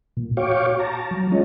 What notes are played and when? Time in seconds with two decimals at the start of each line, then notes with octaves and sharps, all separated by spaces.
0.17 A#2
0.37 F#4 C#5 F5 G5 C#6 D6
0.79 A5 A#5
1.11 F#3
1.31 G#3 C#4 F4 C#5 D#5